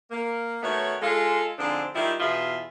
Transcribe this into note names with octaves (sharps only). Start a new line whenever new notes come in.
A#3
D#3 A3 B3 F#4 C#5
G#3 F4 A4
G#2 D3 F3 C4 D4
D#3 G3 G#3 E4 F4 G4
E2 B2 F4 G#4 E5